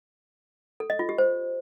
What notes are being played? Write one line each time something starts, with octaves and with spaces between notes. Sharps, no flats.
A4
D#5
F4
G4
C5